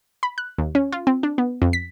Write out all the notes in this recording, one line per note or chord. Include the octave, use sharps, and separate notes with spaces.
B5
F#6
D#2
C#4
F4
C4
D4
B3
F2
B6